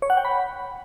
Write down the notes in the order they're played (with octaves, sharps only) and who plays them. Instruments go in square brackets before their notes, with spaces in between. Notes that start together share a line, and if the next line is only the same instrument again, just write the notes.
[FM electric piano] C#5
F#5
G5
B5